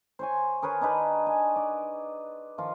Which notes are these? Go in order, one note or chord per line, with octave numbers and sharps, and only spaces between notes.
C5 C#5 G#5
G#4 A#4 B4 C#5
D4 D#4 B4
G#5
D5
D#3 F3 F4